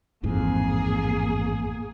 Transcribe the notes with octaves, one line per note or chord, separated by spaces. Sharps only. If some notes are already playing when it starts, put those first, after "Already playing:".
A1 F2 G#2 A#3 G#4